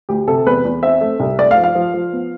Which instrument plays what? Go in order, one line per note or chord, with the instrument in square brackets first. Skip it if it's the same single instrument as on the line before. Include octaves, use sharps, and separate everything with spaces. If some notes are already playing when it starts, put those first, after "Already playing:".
[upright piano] D2 G4
C3 A4
E2 B4
E2
C4 E5
A3
C2
A3 D5
F5
F3
F5
F3
F3
B3